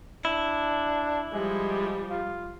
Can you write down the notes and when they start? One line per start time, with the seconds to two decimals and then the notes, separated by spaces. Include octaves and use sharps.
0.25 D4 E4
1.33 F3 G3 G#3
2.10 F4